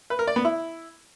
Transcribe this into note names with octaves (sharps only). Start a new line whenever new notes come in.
B4
A#4
D5
B3
E4